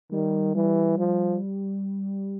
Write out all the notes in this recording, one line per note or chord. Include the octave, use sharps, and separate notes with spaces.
D#3 G3
E3 G3
F3